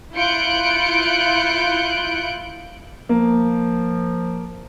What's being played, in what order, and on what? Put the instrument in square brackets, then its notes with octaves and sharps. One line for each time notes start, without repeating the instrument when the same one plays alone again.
[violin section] E4 F4 F#6 G6 C#7 D7
[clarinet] F3 [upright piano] A#3